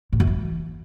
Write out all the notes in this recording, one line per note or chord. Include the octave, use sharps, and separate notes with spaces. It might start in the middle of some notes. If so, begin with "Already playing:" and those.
A2
F#2
E3